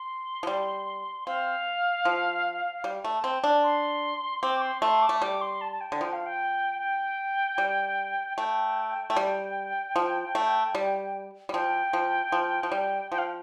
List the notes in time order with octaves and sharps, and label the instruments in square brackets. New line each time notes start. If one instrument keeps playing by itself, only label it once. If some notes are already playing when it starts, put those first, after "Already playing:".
Already playing: [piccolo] C6
[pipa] F3
G3
[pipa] C4 [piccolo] F5
[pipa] F3
G3
A3
C4
D4
[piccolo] C6
[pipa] C4 [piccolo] D6
[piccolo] C6
[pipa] A3 [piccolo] C6
[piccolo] D6
[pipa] A3
[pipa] G3 [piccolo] D6
[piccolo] C6
A5
A5
G5
[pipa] D3
[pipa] F3 [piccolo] G5
[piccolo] F5
G5
G5
[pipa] G3
[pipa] A3 [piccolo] G5
[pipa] A3
G3
F3
A3
G3
G3
[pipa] F3 [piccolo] G5
[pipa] F3
F3
F3
G3
[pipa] F3 [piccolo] G5
[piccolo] F5